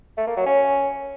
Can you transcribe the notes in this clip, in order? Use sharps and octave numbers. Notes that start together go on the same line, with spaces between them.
A3
A#3
F#3
C#4